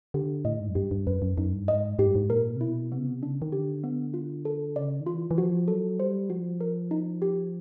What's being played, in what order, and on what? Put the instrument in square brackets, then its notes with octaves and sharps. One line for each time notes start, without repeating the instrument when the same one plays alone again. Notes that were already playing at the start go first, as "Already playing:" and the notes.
[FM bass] D3 [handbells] G4
[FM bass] A2 [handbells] D#5
[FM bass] G#2
F#2
[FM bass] G2 [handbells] G4
[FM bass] G2
[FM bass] F#2 [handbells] B4
[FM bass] F#2
[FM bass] F#2 [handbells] D#4
[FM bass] G2
[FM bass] G#2 [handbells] D#5
[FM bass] G#2 [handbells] G4
[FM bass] G2
G#2
[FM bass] A#2 [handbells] A#4
[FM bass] C3
[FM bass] B2 [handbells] E4
[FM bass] C3 [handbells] B3
[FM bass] C#3
C3
[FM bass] C#3 [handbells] D4
[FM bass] D#3
[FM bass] D3 [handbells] G4
[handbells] B3
F4
A4
[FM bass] C#3 [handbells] D5
[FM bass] D#3
[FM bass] E3 [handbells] F4
[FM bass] E3
[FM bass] F3 [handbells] F#4
[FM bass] F#3 [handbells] A4
[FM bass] G3 [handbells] C5
[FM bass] F3 [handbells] F#4
[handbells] A#4
D#4
G4